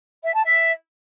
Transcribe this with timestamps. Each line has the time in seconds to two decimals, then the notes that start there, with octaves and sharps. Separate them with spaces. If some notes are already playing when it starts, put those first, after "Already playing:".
0.24 E5
0.34 A5
0.44 E5